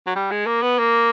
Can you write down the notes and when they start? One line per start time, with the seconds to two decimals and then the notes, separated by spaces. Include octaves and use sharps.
0.07 F#3
0.16 G3
0.31 G#3
0.46 A#3
0.62 B3
0.78 A#3